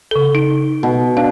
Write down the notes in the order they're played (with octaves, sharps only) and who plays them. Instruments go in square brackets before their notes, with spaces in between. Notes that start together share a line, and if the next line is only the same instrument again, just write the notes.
[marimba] C#3 A4
D#4
[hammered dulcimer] B2
[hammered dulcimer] D4 [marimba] F5